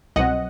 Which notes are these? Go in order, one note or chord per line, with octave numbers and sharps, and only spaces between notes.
C2 B2 F#3 C4 D#5 F#5